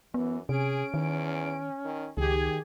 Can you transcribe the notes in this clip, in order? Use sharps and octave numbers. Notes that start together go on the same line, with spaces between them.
F#2 E3 B3
C3 C#4 G#4 D7
E2 D#3
D#3
C#2 D#3 G4 G#4 G#6